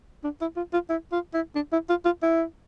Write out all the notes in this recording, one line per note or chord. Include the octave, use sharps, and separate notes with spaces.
D4
E4
F4
F4
E4
F4
E4
D4
E4
F4
F4
E4